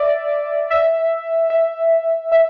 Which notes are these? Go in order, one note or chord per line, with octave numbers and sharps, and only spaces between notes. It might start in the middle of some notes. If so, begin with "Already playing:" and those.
Already playing: D5 E5
E5
E5
E5